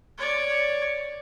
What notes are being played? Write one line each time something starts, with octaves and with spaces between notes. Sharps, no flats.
C#5 D5